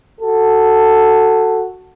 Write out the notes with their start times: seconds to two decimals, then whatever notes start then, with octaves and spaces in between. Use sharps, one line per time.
0.20 F#4 A4